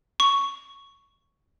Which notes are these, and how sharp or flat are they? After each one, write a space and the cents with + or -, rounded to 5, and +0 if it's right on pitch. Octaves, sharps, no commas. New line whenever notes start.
C#6 +5